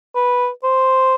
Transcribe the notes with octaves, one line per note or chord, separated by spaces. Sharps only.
B4
C5